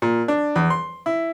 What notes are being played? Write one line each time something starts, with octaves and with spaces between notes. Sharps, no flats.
A#2
D4
E2
C6
E4